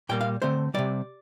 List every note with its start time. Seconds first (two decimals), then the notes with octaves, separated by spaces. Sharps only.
0.09 A#2 G3 A#3 G5
0.21 F5
0.42 D3 A3 C4 C5
0.74 C3 E3 G3 D5